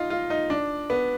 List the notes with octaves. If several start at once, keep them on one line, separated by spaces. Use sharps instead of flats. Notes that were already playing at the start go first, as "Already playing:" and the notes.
Already playing: D#4 F4
F4
D#4
D4
B3